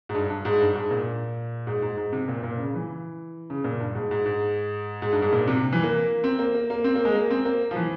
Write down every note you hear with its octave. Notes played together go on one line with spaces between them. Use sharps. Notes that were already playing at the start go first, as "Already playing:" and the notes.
G#2
G2
G2
G#2
G2
G#2
A#2
G#2
G#2
G#2
C3
A#2
A#2
C#3
E3
C#3
A#2
G2
G#2
G#2
G#2
G#2
G2
G#2
A#2
C3
E3
A#3
C4
A#3
A#3
A#3
C4
A#3
G#3
A#3
C4
A#3
F3
E3